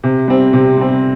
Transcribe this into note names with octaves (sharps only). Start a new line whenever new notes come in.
C3
G3 C4
C3
G3 C4